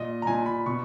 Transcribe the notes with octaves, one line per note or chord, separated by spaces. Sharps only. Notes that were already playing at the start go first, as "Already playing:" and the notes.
Already playing: A#2 D#5
A#5
A#2 G#5
B5
B2 C#6